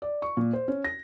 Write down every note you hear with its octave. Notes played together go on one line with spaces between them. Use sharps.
D5
C#6
A#2
C5
C#4
A#6